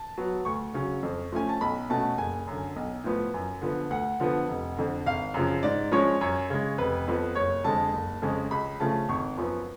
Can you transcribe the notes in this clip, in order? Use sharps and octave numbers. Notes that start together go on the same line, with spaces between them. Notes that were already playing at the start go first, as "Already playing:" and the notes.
Already playing: A5
F#3 B3
D2 C#6
C#3 F#3 C#4
F2
F3 A3 C#4 G#5
A5
B1 B5
B2 A3 C#4 A5
F#1 G#5
F#2 D3
B1
A2 F3 B3
F#2
D3 F3 B3
D2 F#5
D3 F3 B3
F1
F2 D3
G#1 F5
F#2 C#3 F3
G#2 D5
F3 G#3 C#4 C#5
F#2 C#5
C#3 G#3
F1 B4
F2 F3 B3
F#1 C#5
F2 D3 G#3 A5
F#1
F2 C#3 G#3 C#4
C#2 B5
C#3 F3 A3 C#4 A5
G#1 C#6
F#2 F3 B3